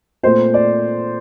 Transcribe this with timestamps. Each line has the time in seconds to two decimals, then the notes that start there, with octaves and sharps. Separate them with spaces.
0.23 A#2 A3 C4 C5
0.54 D5